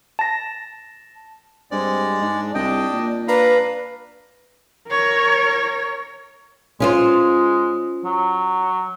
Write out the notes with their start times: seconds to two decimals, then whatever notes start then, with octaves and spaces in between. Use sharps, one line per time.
0.19 A5 A#6
1.71 G2 G#3 C4 D5
2.21 G#2 D4
2.54 C2 D4 D#5 G5
2.92 A#2
3.28 D4 B4 F5 A#5 B5
4.89 A#4 C#5
6.80 G#3 C#4 F4 C5
8.04 F#3